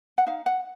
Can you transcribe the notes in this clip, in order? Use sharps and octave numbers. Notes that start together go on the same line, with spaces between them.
F#5
D#4 F5
F#5